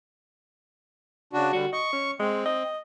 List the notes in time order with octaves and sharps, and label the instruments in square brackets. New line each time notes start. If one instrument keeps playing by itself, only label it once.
[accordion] C#3 D4 F#4
[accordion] D3 G3 [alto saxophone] F#4
[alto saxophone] D#5 [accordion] C#6
[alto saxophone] C#4
[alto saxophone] G#3 [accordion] C4
[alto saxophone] D#5